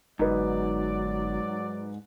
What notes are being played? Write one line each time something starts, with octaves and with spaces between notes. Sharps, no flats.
G1 G#2 F#3 D#4 B4 D5